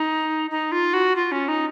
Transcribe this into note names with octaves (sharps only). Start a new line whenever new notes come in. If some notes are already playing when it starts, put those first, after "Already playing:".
Already playing: D#4
D#4
F4
F#4
F4
C#4
D#4